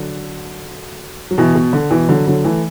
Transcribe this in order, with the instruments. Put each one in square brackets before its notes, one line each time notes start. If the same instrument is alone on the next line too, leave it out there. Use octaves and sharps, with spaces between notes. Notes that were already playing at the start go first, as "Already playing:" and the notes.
Already playing: [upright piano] D3 F#3
F#3
B2 E3
B2
D3
B2 E3
D3 F#3
D3 F#3
E3 A3